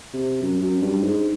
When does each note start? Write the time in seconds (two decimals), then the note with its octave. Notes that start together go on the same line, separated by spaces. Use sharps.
0.13 C3
0.42 F#2
0.62 F#2
0.82 G2
1.03 G#2